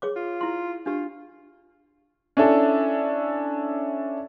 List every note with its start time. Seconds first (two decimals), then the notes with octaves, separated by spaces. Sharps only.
0.02 G#4 C#5 D6
0.16 F4
0.41 E4 C6
0.86 D4 F4 G4
2.37 C#4 D4 E4 A4